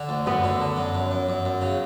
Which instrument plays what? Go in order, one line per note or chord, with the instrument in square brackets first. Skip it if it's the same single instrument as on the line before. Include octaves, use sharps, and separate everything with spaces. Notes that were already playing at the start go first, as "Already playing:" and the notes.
Already playing: [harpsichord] D3
D2
[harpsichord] F#2 [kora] B3
[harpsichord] D3
D3
F#2
F#2
F#2
F#2
F#2
C#3